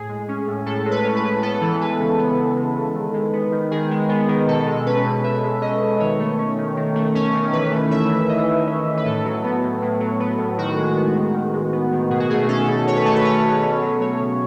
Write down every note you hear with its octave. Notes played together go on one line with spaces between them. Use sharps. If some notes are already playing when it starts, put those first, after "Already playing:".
Already playing: A2 G#4
G#3
C#4
A2
A2 A4
G#3
B4
C#4
B4
A2
B3 A4
E3
G#3 B4
C#3
B3
E3
G#3
C#3
D#3
G#3
B3
D#3
D#3 G#4
G#3
B3
D#3
B2 A4
G#3
C#4 B4
B2
B2 E5
G#3
C#4 D#5
B2
D#3 C#5
A3
C#4
D#3
D#3
A3
C#4
D#3
E3 B4
A3
C#4 E5
E3
E3 D#5
A3
C#4
E3
B4
A2 A4
F#3
B3
A2
A2
F#3
B3
A2
D#3 F#4
G#3
B3
D#3
D#3
G#3
B3
D#3
B2 G#4
F#4
A3 G#4
C#4 A4
B2
B2 C#5
B4
A3 A4
B4
C#4 C#5
B2
C#4
F#3
A3 C#5
C#3